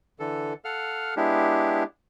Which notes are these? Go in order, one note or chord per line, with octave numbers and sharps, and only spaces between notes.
D3 E3 A4
A4 F5 F#5 F6
G#3 B3 D4 E4 G4